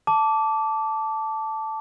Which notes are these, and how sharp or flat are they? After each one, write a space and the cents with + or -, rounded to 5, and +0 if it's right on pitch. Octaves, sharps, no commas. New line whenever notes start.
A5 +0 D6 -15